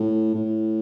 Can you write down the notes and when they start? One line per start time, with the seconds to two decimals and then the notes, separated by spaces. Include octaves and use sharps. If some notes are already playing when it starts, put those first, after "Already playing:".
Already playing: A2
0.35 A2